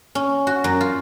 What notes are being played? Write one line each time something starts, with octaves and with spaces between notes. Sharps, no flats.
C#4
F#4
F#2
F4